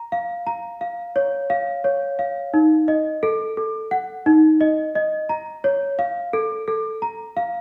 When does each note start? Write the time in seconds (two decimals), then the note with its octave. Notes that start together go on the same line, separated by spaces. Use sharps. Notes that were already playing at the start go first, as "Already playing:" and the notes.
Already playing: A#5
0.12 F5
0.47 A#5
0.81 F5
1.16 C#5
1.50 F5
1.84 C#5
2.19 F5
2.54 D#4
2.88 D#5
3.23 A4
3.57 A4
3.91 F#5
4.26 D#4
4.61 D#5
4.95 D#5
5.29 A#5
5.64 C#5
5.99 F5
6.33 A4
6.68 A4
7.02 A#5
7.37 F5